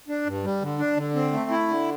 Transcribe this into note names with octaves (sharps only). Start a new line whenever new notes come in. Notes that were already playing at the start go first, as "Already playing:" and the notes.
D4
G2
G3
D3
D4
D3
C4
A3
E4
D3